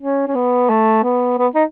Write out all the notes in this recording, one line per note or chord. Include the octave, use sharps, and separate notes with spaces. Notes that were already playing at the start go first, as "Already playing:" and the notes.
C#4
C#4
B3
A3
B3
B3
D#4